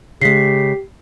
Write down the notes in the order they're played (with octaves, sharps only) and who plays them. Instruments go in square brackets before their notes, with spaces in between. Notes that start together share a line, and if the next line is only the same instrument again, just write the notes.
[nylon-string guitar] C#3 G#3 [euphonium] G4 [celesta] B6 C7